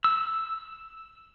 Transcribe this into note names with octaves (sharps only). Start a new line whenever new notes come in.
E6